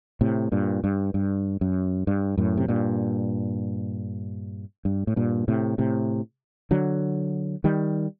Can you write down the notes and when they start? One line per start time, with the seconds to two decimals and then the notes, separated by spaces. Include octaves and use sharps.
0.21 A2 C3
0.52 G2 A#2
0.84 G2
1.14 G2
1.61 F#2
2.07 G2
2.37 F#2 A2
2.57 C3
2.68 G2 A#2
4.85 G2
5.07 A2
5.16 G2 A#2
5.48 A2 C3
5.78 A2 C3
6.71 D3 F#3
7.64 D#3 G3